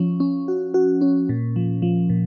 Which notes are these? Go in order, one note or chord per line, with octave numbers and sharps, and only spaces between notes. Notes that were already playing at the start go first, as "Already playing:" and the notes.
Already playing: F3 C#4
C#4
F#4
F#4
C#4
A#2
F3
F3
A#2